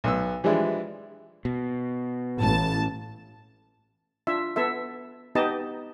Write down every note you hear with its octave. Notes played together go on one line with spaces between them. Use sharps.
B1 B3 E6
E3 F3 G3 G#3 D4 E4
B2
A1 A5
D4 F4 E5
B3 A4 E5
B3 D#4 G4 D#5 A5